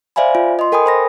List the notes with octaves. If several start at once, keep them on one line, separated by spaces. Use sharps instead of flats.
C5 D5 E5 F5 G#5 B5
F4
D#5 C6
A4 A#4 G5 G#5 B5 D#6
C5 B5 A#6